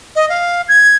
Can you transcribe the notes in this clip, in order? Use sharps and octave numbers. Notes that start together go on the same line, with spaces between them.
D#5
F5
G#6